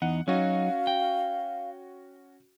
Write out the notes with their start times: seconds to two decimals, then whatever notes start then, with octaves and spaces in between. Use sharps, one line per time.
0.02 E2 D#4 F#5
0.28 F#3 C#4 D#4 F#4 F5
0.87 G5